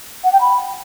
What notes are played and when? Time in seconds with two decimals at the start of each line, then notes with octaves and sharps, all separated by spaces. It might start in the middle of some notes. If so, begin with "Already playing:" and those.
0.24 F#5
0.32 G5
0.41 B5